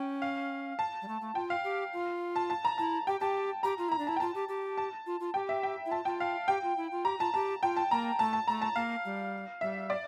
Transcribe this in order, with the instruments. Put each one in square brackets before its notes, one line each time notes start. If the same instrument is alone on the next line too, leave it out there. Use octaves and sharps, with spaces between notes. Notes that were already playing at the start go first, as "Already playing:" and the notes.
Already playing: [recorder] C#4 [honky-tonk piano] G5
[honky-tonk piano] F5
A5
[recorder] G3
A3
A3
[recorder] F4 [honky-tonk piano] G5
[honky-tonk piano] F5
[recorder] G4
F4
[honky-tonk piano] A5
A5
A#5
[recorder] E4 [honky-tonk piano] A5
[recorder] G4 [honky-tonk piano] G5
[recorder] G4 [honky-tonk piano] A5
[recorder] G4 [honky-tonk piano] A#5
[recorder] F4
[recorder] E4 [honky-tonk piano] A#5
[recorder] D4
[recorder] E4 [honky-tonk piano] A5
[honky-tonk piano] G5
[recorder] F4 [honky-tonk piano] A5
[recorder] G4
G4
[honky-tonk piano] A5
[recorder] F4
F4
[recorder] G4 [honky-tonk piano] G5
[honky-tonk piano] E5
G5
[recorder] E4
[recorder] F4 [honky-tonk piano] A5
[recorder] F4 [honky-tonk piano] G5
[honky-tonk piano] F5
[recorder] G4 [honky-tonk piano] G5
[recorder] F4
E4
F4
[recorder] G4 [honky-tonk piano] A#5
[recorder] F4 [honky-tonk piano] A5
[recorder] G4 [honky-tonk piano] A5
[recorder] F4 [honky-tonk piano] G5
[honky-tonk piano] A5
[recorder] A#3 [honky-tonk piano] A#5
[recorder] A3 [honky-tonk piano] A5
[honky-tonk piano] A5
[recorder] A3 [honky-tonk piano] A#5
[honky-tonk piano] A5
[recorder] A#3 [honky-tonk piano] F5
[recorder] G3
[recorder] G3 [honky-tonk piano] E5
[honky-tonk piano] D5